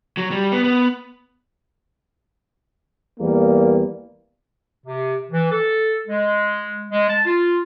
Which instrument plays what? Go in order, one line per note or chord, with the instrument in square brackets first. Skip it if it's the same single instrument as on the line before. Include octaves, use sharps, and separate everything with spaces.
[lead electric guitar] F#3
G3
B3
B3
[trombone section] E2 G3 A#3
[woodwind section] C3
E3
A4
G#3
G#3
A5
F4